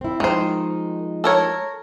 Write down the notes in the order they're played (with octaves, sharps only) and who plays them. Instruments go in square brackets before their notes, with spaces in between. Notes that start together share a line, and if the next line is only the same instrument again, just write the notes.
[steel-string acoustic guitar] C4 E4
[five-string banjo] D#3 C5 [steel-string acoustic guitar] F3 G#3 D#4
[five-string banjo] A4 A#4 C#5